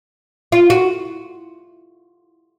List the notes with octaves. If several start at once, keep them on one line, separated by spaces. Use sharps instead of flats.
F4
F#4